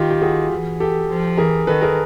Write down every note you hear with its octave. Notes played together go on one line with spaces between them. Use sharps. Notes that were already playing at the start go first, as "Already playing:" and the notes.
Already playing: D#3 F4 G4
G4
F#4 G#4
E3
G4 A4
F3
E3 G#4 A#4
D#3 A4 B4
G#4 A#4